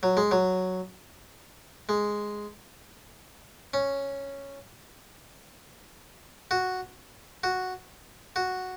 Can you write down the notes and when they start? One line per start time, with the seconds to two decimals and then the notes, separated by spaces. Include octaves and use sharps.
0.03 F#3
0.17 G#3
0.31 F#3
1.89 G#3
3.74 C#4
6.51 F#4
7.43 F#4
8.36 F#4